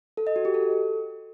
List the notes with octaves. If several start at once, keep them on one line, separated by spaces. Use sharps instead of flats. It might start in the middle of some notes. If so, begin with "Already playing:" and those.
A4
D#5
F#4
G4
A4